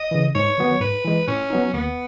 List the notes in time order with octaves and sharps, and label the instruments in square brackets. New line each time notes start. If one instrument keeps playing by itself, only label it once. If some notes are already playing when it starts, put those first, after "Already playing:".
Already playing: [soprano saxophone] D#5
[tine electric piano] C#3 E3
[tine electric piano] G#2 [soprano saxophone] C#5
[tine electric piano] D#3 F#3 B3
[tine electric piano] G#2 [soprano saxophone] B4
[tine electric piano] E3 G#3
[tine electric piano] A2 [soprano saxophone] C#4
[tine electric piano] F#3 B3 D#4
[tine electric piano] D#2 [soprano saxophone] B3